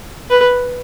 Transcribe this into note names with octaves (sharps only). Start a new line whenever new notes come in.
B4